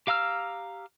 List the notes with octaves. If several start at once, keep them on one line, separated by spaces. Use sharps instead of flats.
G4 F5 A#5 E6 F6